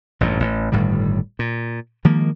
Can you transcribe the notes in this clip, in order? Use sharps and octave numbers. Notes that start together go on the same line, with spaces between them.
A1 G2 A#2
A1
G1 A2 D#3 G3
A#2
D#3 F3 G#3 A#3